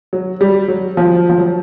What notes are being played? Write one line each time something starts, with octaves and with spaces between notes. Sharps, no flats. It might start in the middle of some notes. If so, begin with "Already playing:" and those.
F#3
G3
F#3
F3
F3
F#3